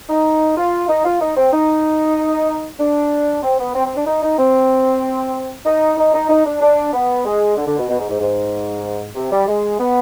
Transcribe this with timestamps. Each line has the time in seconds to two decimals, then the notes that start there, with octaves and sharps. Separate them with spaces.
0.09 D#4
0.56 F4
0.89 D#4
1.05 F4
1.20 D#4
1.37 C4
1.52 D#4
2.79 D4
3.43 C4
3.59 B3
3.75 C4
3.86 C4
3.96 D4
4.07 D#4
4.23 D#4
4.39 C4
5.66 D#4
5.97 D#4
6.14 D#4
6.30 D#4
6.46 D4
6.61 D4
6.93 B3
7.25 G#3
7.57 D3
7.67 D3
7.78 B2
7.88 B2
7.99 G#2
8.09 G#2
8.21 G#2
9.15 C3
9.32 G3
9.47 G#3
9.79 B3